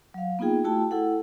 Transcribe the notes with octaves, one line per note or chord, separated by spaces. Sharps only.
F#3 F5
A#3 B3 D#4 F4 G#4 G5
A3 E4 F#4 G5 A5
E4 A4 F#5